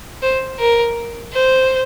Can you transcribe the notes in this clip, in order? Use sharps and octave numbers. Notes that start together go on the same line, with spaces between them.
C5
A#4
C5